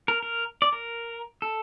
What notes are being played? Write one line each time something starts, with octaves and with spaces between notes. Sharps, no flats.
A#4
A#4
D5
A#4
A4